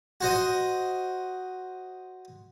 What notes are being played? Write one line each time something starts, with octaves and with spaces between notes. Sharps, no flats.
F#4 C5 D#5